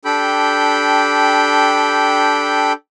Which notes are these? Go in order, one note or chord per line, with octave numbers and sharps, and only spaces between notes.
D4 G4 A4 G5 B5 G6